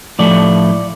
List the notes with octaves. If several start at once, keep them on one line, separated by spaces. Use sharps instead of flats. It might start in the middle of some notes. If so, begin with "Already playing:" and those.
A2 F3 A3 D5